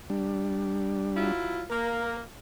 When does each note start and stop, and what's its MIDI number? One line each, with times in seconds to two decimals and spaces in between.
0.10 1.32 55
0.10 1.32 62
1.15 1.62 54
1.15 1.62 64
1.15 1.62 65
1.70 2.19 58
1.70 2.17 70